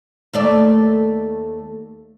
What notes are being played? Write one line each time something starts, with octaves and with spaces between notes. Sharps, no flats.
D#2 A3 D5